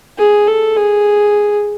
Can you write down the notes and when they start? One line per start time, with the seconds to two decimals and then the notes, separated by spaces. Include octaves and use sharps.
0.18 G#4
0.47 A4
0.76 G#4